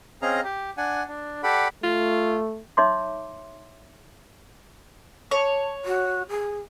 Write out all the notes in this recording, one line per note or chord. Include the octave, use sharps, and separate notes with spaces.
C4 C#4 G#4 D#5 F5 A#5
G4
D4 F#5 G#5
D4
G4 A4 D5 F#5 B5
A3 F4
D#4 C#5 E5 C6 D6
C#5 A5
F#4
G#4